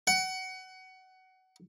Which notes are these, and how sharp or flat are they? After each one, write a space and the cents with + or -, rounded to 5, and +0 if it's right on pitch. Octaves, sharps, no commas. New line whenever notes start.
F#5 +20